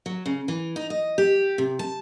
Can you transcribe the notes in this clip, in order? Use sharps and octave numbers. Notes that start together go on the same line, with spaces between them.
F#3
C#3
E3
D#4
D#5
G4
C3
A5